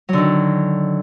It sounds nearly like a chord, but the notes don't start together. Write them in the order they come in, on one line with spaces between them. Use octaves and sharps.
F#3 D3 D#3